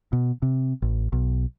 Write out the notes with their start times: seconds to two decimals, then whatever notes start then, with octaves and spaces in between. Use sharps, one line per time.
0.13 B2
0.42 C3
0.82 A1
1.12 B1